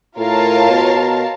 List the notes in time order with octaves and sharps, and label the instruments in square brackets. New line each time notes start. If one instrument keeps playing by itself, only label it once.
[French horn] A2 [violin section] F4 A#4 C#5 F5 A5
[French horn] B2